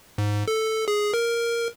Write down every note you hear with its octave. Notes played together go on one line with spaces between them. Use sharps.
G#2
A4
G#4
A#4